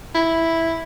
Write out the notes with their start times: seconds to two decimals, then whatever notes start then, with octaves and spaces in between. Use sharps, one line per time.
0.15 E4